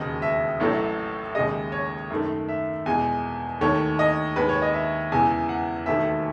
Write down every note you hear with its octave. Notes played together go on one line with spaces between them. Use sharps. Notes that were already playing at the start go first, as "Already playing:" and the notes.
Already playing: E1 D#2 C#3 D#5
E5
A1 A2 F#3 A3
D#2 C#3 G#3 D#5
C#5
F#2 D#3 A3
E5
E2 B2 G#3 G#5
D#2 D#3 A3 C#5
D#5
D#2 D#3 G#3 B4
C#5
D#5
E5
E2 C#3 E3 G#3 G#5
F#5
E1 D#2 D#3 A3 E5